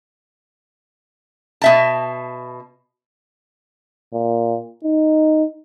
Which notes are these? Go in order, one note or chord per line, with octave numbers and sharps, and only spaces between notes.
B2 E5 A5
A#2
D#4